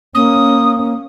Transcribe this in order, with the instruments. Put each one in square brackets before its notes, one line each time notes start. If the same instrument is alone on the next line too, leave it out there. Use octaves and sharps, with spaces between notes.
[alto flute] A#3 [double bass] C#4 [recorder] D#6